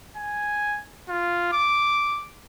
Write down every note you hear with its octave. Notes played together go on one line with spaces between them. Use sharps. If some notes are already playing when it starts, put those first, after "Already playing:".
G#5
F4
D6